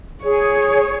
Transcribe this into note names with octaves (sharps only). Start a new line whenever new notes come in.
G#4 C#5